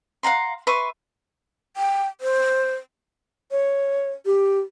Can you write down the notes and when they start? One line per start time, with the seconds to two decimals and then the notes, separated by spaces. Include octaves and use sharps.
0.23 F5 F#5 A#5 C6
0.67 B4 E5 C6 C#6
1.77 G5
2.21 C5
3.51 C#5
4.26 G4